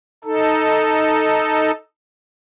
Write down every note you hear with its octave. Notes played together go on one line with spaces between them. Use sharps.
D#4 A4